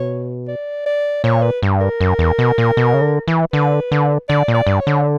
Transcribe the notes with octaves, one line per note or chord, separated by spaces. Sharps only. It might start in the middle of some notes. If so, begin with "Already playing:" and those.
Already playing: B2 C#5
D5
D5
A#2 C#5
B4
G2
A#4
F#2
E2
B2
A#2
B2
C#3
D3
E3
D3 B4
D3
D3 D5
A#2
D5
G2
C#5
D3